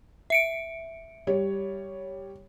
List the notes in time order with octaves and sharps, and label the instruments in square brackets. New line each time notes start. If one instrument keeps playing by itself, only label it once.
[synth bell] E5 C#7 D7
[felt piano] G3 C#5